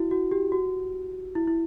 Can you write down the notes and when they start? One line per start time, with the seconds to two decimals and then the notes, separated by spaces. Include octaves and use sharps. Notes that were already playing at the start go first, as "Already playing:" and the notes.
Already playing: E4 F#4
0.11 F#4
0.32 G4
0.52 F#4
1.35 E4
1.47 E4